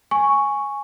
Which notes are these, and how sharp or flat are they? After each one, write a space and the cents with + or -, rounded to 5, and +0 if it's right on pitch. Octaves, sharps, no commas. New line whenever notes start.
G#5 +0 C#6 +0